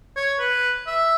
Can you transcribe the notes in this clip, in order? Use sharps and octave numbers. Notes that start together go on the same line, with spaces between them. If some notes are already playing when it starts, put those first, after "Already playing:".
C#5
B4
E5